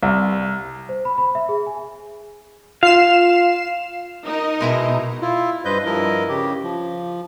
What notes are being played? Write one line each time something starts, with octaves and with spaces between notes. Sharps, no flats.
C2
C5
B5
B5
E5
G#4
G#5
F4 F5 C7 E7
D#4 A#4 D#5
B2 G#3 E4 A#5
E4 F4
G2 B4 C5 D#5 G6
G2 F3 E4 A#4 D#5
C#3 G4
F3